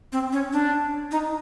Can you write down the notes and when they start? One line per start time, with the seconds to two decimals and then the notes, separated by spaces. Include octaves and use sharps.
0.12 C4
0.33 C#4
0.53 D4
1.12 D#4